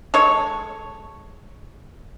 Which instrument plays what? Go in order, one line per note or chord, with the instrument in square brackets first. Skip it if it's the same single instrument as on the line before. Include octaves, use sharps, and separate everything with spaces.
[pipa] G#3 A4 C#5 C#6